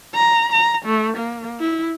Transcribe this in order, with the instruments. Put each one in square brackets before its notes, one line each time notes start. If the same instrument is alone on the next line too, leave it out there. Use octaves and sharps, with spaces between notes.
[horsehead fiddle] A#5
A#5
A3
A#3
E4